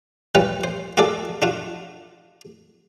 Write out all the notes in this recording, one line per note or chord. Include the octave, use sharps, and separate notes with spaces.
G3 C#4 F4 B4
C5
F4 F#4 G#4 A4 D5
D4 F4 F#4